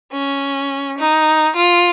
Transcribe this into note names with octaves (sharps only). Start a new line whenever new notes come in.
C#4
D#4
F4